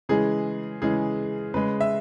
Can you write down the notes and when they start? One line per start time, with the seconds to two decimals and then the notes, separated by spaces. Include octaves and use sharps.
0.09 C#3 E3 G#3 G#4
0.82 C#3 E3 G#3 G#4
1.54 C#3 G#3 B4
1.81 E5